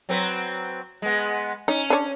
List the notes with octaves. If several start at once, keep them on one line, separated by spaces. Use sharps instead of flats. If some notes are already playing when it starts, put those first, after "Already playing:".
F#3 C4 B4
G#3 B3
C#4 D#4
D4 C#5